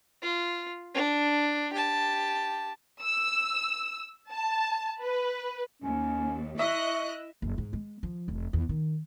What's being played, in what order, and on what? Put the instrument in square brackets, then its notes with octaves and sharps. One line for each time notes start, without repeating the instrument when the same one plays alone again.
[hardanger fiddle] F4
D4
G4 A5
[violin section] E6
A5
B4
[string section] D#2 [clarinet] C#4
[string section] E4 D#5 F#6 [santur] E5 [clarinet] C#6
[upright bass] F#1
G#2
G#3
F3
F1
E2
D#3